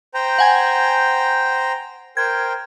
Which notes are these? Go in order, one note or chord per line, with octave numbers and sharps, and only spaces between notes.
C5 G5 A#5
F#5 G#5 G#6
A#4 C5 G5 G#6